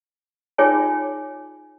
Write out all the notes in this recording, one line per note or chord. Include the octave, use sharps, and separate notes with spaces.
D#4 F4 G#4 C#5 G5 G#5